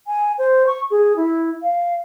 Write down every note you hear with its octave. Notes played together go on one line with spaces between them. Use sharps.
G#5
C5
C#6
G#4
E4
F5